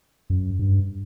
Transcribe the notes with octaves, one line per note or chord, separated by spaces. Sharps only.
F#2
G2